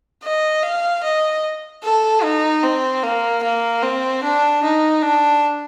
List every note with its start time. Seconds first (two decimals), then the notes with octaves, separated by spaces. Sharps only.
0.23 D#5
0.63 F5
1.03 D#5
1.84 A4
2.23 D#4
2.63 C4
3.03 A#3
3.43 A#3
3.83 C4
4.23 D4
4.64 D#4
5.02 D4